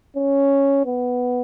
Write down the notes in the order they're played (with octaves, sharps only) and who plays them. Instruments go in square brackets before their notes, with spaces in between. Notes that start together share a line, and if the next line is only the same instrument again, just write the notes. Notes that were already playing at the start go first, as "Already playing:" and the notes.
[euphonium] C#4
B3